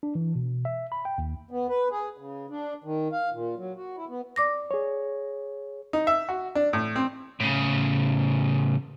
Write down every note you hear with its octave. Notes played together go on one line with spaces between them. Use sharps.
D4
E3
B2
E5
B5
G5
D#2
B3
B4
G#4
C#3
D4
D#3
F5
A#2
F#3
F#4
E4
B3
D5 D6 A#6
G#4 C#5
D#4
E5
F#4
D4
A2
C4
A2 C#3